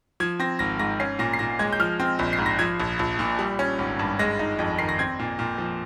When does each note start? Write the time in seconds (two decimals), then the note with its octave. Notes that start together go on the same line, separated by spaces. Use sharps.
0.20 F3 G#6
0.39 C4 A#6
0.59 G#1 A#6
0.79 G#2 A#6
1.00 C#4 C7
1.19 A#2 A#6
1.33 C7
1.39 A#2 A#6
1.59 G#3 G#6
1.73 G6
1.79 F3 F6
2.00 C4
2.19 A#1
2.33 C7
2.39 G#2
2.46 A#6
2.59 F3 G#6
2.80 A#1
2.99 A#1
3.19 A#2
3.39 G3
3.59 C#4
3.78 G#1
3.99 G2
4.19 G#3 A#6
4.39 D#4
4.59 F2
4.79 D#3 C7
4.89 A#6
4.99 C4 G#6
5.19 A#2
5.39 A#2
5.58 F3